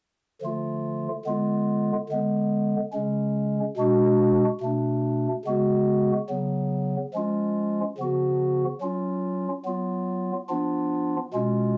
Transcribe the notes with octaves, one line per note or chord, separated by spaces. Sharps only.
D3 F3 A3 F4
D3 G#3 B3 F4
D3 G#3 B3
C#3 G#3 C#4
B2 G#3 D4 F#4
B2 A3 D4
C#3 G#3 B3 F#4
C#3 F#3 B3
F3 G#3 C#4 F4
C#3 F3 B3 F#4
F#3 C#4 F4
F#3 B3 F4
F3 B3 D4 F4
B2 G#3 C#4 F4